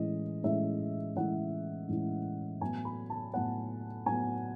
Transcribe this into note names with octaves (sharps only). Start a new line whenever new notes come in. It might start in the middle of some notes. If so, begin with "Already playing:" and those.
Already playing: A2 E3 G#3 C#4 E4 D#5
A2 E3 G#3 C#4 E4 E5
A2 E3 G#3 C#4 E4 F#5
A2 E3 G#3 C#4 E4
A2 F#3 B3 G#5
B5
A5
A2 F#3 B3 F#5
A2 F#3 B3 G#5